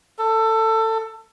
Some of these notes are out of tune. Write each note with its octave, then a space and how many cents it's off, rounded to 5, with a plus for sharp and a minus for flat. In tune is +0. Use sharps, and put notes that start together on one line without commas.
A4 +20